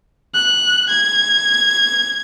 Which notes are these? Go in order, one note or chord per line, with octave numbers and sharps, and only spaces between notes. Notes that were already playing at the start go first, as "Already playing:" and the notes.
F#6
G#6